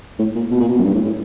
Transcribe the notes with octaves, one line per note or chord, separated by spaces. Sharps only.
A2
A#2
B2
A#2
B2
F#2
G2
A2
A2